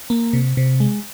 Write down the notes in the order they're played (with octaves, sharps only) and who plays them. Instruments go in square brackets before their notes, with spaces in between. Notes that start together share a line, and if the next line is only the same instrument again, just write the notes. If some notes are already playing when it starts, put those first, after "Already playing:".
[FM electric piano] A#3
C3
C3
G#3